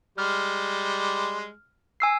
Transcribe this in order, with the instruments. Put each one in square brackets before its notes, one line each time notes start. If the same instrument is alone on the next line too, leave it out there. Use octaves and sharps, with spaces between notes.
[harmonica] G3 G#3 [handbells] F6
[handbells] G#5 E6 C7